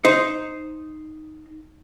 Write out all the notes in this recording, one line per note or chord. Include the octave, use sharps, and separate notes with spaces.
D#4 C5